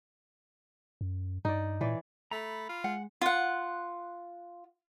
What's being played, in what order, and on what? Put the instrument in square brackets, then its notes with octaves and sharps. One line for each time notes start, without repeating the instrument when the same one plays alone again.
[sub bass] F#2
[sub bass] G2 [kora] D#4 D5
[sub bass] A#2 [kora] E3 C#5 D5
[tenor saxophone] A3 [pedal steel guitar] A#5 B5
[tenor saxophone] F4
[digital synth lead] G#3 [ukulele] F#5
[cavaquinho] F4 F#5